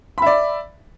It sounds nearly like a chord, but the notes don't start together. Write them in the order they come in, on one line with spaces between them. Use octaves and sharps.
B5 E5 D5